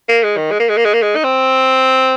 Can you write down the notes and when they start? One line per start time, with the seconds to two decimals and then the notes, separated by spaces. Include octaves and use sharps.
0.09 A#3
0.24 G#3
0.37 D#3
0.51 G#3
0.60 A#3
0.69 G#3
0.77 A#3
0.85 G#3
0.94 A#3
1.02 G#3
1.16 D#4
1.24 C4